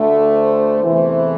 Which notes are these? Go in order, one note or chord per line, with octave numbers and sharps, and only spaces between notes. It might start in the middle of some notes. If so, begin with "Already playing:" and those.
Already playing: D2 D3 A3
C5
E2 C3 E3 A3